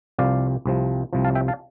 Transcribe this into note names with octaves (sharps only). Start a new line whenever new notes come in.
C2 C3 F3 D5 F5
C2 C3 F3
C2 C3 F3
F5 A5
E5 G5
F5 A5